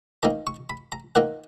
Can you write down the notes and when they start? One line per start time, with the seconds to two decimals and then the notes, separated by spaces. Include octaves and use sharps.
0.23 D#3 A#3 D#4 A#5
0.47 C#6
0.70 B5
0.92 A#5
1.15 D#3 A#3 D#4 F#5